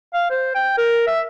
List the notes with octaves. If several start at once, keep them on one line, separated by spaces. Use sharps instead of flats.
F5
C5
G5
A#4
E5